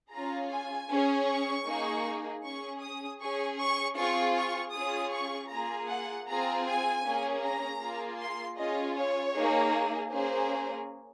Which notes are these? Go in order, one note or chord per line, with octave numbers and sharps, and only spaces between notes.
C#4 F4 G#4 A#5
G#5
C#4 G#4
C#6
A#3 D#4 G#4
C#4 G#4 C#6
D#6
C#4 G#4 C#6
C#6
C4 F4 G#4 C#6
C#6
C#4 F4 G#4 D#6
C#6
A#3 F4 G#4 A#5
F#5
C4 F4 G#4 A#5
G#5
A#3 C#4 G#4
A#5
A#3 F4 G#4
C6
C#4 F4 G#4 D#5
C#5
A#3 D#4 G#4
A#3 C#4 G#4 C5